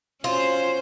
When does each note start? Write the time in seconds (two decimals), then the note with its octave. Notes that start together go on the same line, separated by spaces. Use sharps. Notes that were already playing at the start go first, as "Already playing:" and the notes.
0.24 C#4 F4 F#4 C5